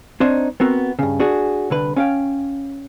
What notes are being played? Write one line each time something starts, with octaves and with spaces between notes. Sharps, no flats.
C4 D4 D#4 C5 C#5
B3 C4 F#4 A#4
G2 C#3
D4 F#4 G#4
C2 D3 B4
C#4 F5 G5